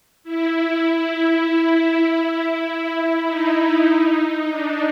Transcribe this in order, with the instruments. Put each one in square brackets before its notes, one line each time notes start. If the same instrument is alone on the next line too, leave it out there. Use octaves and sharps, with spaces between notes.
[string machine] E4
E4
E4
D#4
D4